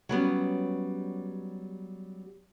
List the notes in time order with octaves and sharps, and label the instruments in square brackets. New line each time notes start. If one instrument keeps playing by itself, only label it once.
[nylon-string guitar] F#3 G3 B3 C#4